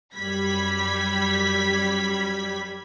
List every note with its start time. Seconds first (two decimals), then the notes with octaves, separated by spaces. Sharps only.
0.16 F#2 G3 B5 G#6 B6